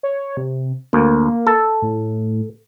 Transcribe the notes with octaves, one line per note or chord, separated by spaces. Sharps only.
C#5
C3
D2 A#3
A4
A2